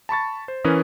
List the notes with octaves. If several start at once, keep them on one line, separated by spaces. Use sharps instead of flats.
A5 B5 C#6 A6
C5
E3 C#4 A#4 B4 D#6